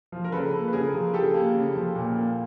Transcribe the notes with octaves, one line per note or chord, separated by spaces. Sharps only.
F3
A#4
C#3 A4 B4
A#3
B4
C#3 G#4 A#4
F3
C#3 G4 A4
A#3
C#3
F3
A#2
A#3